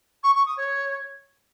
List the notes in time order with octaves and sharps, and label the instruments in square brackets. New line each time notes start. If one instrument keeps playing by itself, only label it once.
[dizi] C#6
C#6
D#6
C#5